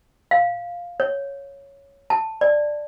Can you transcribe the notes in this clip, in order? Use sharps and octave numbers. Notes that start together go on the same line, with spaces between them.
F5
C#5
A5
D5